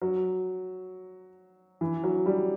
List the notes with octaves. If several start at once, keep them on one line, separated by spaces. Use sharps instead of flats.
F#3
E3
F#3
G3